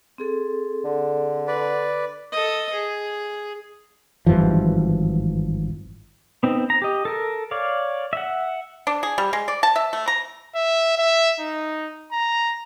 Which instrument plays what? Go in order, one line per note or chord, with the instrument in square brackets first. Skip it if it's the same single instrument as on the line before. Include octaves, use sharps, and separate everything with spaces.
[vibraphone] C4 G#4 A4
[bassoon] D3
[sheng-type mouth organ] B4 D5
[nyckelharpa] A4 D#5
G#4
[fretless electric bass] G#1 G2 E3 F3
[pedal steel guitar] B3 C4 D#4
A#5
G4 D#5
A4 A#4
C#5 D5 F5
E5 F#5
[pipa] D4
G#4
G3
G#3
D5
A5
E5
A3
A#5
[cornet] E5
E5
D#4
A#5